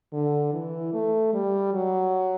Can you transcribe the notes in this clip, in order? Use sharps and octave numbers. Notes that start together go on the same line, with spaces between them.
D3
E3
A3
G3
F#3